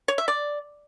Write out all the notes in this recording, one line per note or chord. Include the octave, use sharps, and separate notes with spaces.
C#5
E5
D5